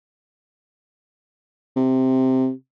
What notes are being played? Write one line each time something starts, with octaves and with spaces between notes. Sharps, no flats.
C3